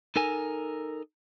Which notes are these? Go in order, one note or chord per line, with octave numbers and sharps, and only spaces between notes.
D#4 A4 A#4 G#5